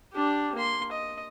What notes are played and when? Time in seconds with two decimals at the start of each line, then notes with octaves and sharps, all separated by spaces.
0.13 D4 G4
0.55 A#3 C6
0.92 D#5